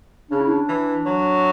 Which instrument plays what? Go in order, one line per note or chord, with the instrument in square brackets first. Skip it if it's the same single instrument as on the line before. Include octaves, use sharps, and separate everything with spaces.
[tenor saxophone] C#3 [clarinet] D4
[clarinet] E4
D4
[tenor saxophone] E3
F#3